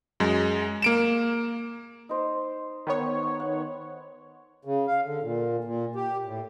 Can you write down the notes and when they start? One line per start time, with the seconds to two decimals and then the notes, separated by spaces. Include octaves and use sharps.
0.20 F#2 G#3
0.82 A#3 D7 E7
2.09 D#4 C5
2.87 D#3 B3 C#5
3.40 F#5
4.65 C#3
4.87 F5
5.05 D3
5.23 A#2
5.64 A#2
5.96 G4
6.25 A2